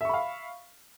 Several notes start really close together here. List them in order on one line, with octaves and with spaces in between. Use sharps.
E5 C#6 B5 F5